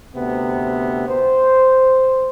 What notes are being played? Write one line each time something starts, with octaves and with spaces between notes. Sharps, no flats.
D2 C3 B3
C5